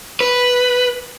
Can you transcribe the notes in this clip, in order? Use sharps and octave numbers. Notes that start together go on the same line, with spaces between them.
B4